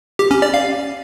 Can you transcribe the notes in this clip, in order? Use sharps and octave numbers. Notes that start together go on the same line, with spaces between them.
G4
C#4
D5
F5